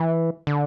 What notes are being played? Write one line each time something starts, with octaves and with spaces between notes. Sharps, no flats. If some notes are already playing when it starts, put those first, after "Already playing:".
Already playing: E3
D3